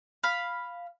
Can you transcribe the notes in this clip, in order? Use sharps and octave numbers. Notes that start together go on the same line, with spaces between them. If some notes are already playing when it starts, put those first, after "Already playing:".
F5 B5